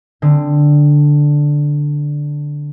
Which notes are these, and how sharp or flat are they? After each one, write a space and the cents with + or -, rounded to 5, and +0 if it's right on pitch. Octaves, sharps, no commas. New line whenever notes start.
D3 +0 C4 +0 D#6 +0